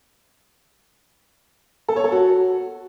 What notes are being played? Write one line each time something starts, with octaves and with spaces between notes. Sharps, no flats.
A4
C#5
A4
F#4